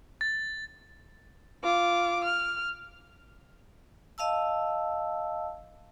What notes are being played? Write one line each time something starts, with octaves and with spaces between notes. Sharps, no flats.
A6
F4 D6
F6
D#5 F5 A5 E6